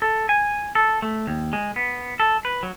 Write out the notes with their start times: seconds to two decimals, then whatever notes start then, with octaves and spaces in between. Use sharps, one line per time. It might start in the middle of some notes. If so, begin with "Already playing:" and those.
0.02 A4
0.29 G#5
0.75 A4
1.02 A3
1.27 D#2
1.53 G#3
1.76 B3
2.20 A4
2.45 B4
2.63 F#3